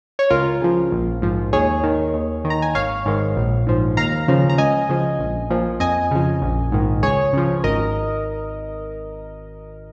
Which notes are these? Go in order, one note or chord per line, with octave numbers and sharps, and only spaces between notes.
C#5
C#2 F4 A#4
C#3 F3
A#1
G#2 F3
D#2 G#4 C#5
D#3
D#2
D#3
A#5
G#5
G#1 C#5 F5
G#2 D#3
A#1
G#2 F3
D#2 F5 A#5
C#3 F3
A#5
C#2 D#5 G#5
C#3 F3
A#1
A#2 F3
F2 D#5 G#5
C#3 F3
A#1
G#2 D#3
C#2 G#4 C#5
C#3 F3
G#1 A#4 D#5